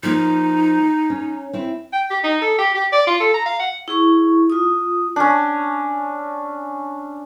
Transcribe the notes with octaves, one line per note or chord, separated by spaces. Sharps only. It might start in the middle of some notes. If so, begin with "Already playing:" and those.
F3 A#3 D#4
C#4
C4 E4
G5
G4
D#4
A4
G4
G4
D5
F4
A4
A#5
F5
F#5
E4 G#4 C#6
F4 D#6
C#4 D4